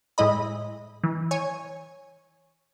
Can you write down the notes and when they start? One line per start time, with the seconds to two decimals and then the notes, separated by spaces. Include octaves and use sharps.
0.18 A2 G#3 E4 D#5 B5
1.04 E3
1.31 C#5 G#5